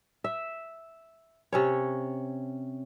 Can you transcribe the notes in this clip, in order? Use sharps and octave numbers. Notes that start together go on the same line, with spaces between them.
E5
C3 C#4 C#5